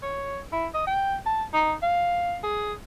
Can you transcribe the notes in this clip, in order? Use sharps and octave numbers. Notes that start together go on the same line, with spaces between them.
C#5
E4
D#5
G5
A5
D#4
F5
G#4